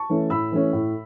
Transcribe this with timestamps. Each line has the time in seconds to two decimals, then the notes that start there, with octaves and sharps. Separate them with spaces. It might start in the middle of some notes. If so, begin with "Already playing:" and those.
Already playing: A5 C#6
0.10 E3 A3 C#4
0.30 A2 B5 E6
0.52 E3 A3 C#4
0.73 A2